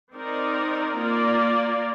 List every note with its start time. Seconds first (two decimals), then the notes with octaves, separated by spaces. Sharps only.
0.13 C4 D#4 A#4 D5
0.97 A#3 F4 A#4 D5